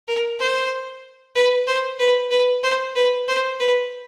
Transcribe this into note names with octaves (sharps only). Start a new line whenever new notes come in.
A#4
C5
B4
C5
B4
B4
C5
B4
C5
B4